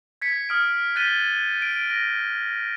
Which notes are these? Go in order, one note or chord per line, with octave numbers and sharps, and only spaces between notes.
G#6 B6 C#7
D#6 F6 D7
F#6 G6 A6 B6 D#7 G7
D7
A#6